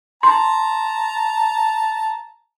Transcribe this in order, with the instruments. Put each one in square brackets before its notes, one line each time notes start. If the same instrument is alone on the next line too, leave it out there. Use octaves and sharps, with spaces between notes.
[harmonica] A5 A#5 [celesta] C6